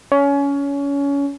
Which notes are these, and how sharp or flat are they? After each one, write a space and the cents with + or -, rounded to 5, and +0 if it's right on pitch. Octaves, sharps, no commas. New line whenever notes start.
C#4 +25